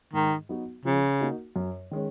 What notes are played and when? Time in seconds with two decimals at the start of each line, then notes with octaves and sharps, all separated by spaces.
0.13 G#2 D#3
0.49 F#3 B3 D#4 F#4
0.85 C#3 F3
1.20 A#3 D#4 F#4
1.56 F#2
1.91 D#3 G#3 C#4